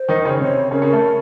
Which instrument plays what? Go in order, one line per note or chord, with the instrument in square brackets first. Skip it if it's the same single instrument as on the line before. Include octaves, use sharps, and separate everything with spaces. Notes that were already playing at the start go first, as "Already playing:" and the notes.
Already playing: [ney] C5
[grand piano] D#3 D#4
C#3 C#4
[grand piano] C3 C4 [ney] C#5
[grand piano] C#3 C#4 [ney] A#4
[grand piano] C#3 C#4
A3 A4